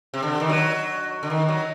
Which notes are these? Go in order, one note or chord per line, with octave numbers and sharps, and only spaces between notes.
C3
D3
D#3
F#3
D3
D#3
F#3